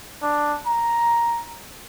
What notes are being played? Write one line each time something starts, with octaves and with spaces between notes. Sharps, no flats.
D4
A#5